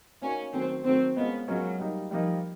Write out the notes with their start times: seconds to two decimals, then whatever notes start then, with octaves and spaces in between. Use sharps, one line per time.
0.22 A#3 C#4 D#4 F#4 A#4 D5
0.53 D#3 F#3 A3 C4
0.84 D#3 F#3 A3 C4
1.16 G#3 B3 C#4 F4 A#4 D#5
1.48 F#3 G#3 C#4 F4 A#4 D#5
1.80 G3 A#3 D#4
2.11 F3 G3 A#3 D#4